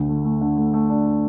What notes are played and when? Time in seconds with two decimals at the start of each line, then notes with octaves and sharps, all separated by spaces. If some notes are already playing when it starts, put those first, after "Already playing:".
Already playing: D2 D3
0.09 A3
0.24 A3
0.41 D3
0.58 A3
0.74 A3
0.90 D4
1.07 D4